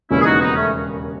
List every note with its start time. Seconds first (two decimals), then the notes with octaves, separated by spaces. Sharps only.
0.10 E1 D#2 C#3 E3 C#4 E4
0.20 G#4
0.25 D#4 F#4
0.40 B3 D#4
0.55 A3 C#4